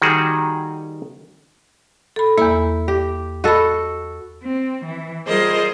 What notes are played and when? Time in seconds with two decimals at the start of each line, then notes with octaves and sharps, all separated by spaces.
0.02 D#3 G3 F#4 G#4
2.16 A4 B5
2.38 E2 A#3 E4
2.88 G4
3.44 F#4 A4 D#5 B5
4.42 C4
4.85 E3
5.27 G3 F4 G#4 A#4 C5 D#5